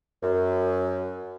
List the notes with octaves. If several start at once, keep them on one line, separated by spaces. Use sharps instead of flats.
F#2